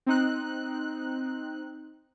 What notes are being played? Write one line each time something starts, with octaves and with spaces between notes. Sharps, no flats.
C4 D#4 F#6